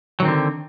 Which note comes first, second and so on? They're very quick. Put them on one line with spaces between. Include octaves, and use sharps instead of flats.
F#3 D#3 C4 D3